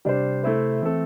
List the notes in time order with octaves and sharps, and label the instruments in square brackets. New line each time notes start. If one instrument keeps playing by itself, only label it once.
[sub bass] C3 [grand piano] G3 D4 C5
[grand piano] A3 E4 C5
[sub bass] E3 [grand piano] A3 C4 A4